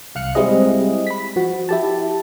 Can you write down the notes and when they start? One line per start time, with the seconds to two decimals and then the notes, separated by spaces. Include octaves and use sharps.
0.15 C2 F5 F6 F#6 C#7
0.35 G3 G#3 C4 E4 G#4 D#5
1.07 B5 B6
1.36 F3 F#4
1.69 E4 G4 A5